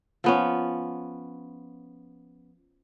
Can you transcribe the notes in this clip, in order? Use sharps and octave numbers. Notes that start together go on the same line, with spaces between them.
F3 B3 C#4